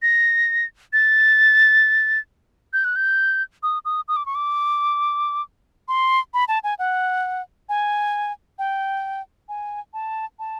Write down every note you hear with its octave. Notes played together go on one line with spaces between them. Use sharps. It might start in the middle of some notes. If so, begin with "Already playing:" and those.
A#6
A6
G6
F#6
G6
D#6
D#6
D#6
D6
C#6
D6
C6
B5
A5
G#5
F#5
G#5
G5
G#5
A5
A5